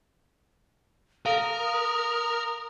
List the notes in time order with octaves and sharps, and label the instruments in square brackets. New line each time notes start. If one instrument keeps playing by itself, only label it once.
[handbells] A4 F5 [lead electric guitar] A#4 [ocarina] D#6